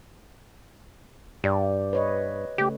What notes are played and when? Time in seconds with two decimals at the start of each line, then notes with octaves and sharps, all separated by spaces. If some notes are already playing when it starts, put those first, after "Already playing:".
1.44 G2 G4 D5
1.93 B4 C#5 D#5
2.58 C#3 A3 G4